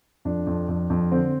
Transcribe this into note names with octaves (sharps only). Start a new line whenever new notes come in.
F2 D4
F2
F2
F2
D3 C4